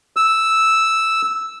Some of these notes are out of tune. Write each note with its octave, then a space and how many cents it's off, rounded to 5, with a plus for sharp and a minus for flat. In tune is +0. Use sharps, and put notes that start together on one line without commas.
E6 -5